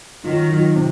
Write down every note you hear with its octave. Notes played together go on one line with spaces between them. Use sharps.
D#3 F#3 F4
F4
C3